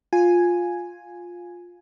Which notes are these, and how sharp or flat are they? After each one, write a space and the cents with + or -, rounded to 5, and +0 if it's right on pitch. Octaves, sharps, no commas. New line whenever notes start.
F4 +10 G#5 +0